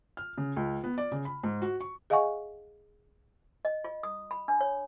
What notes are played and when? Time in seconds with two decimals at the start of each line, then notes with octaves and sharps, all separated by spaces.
0.17 F6
0.38 C#3
0.56 C#2
0.84 B3
0.98 D5
1.12 C#3
1.25 B5
1.43 G#2
1.62 F#4
1.81 C#6
2.10 G#4 D#5 F5 F#5 G#5 C#6
3.65 D#5
3.84 F4
4.03 D#6
4.31 B5
4.48 D4
4.61 C#5